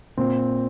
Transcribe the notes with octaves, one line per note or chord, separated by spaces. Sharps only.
A#2 C4